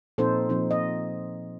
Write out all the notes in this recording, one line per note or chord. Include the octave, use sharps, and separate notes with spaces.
A#2 F3 C4 D#4 A4 C5
A#2 F3 C4 D#4
D#5